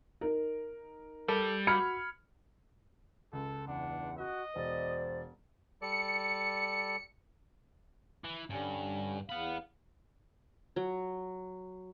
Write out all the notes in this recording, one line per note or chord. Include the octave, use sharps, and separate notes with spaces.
D#4 A#4
G3 A4
F#4 B5 F6 G#6 C#7
C#2 A4
E2 D4 F#5
F#4 D#5
E1 C5 D5
G3 A4 D5 C#7
E3
G2 D3 G3 C#4
E2 F5 F#5 B5
F#3